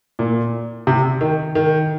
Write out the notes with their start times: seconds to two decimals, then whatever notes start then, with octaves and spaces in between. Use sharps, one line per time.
0.19 A#2
0.87 C3
1.21 D#3
1.55 D#3